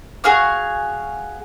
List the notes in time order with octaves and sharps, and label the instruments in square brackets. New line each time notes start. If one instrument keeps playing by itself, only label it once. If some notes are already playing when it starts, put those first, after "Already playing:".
[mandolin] F#4 G#4 F5 C#6